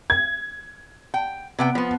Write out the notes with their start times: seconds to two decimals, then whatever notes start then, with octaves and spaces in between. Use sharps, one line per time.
0.10 G#6
1.14 G5
1.59 C3 B3 G5
1.75 F3 B3